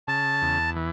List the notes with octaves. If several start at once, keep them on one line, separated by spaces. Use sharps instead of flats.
C#3 A5
E2
E3